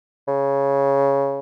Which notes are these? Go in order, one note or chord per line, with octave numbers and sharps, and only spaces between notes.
C#3